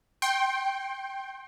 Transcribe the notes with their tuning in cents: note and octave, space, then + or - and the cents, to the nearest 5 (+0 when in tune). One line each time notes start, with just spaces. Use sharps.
G5 -5 C6 +35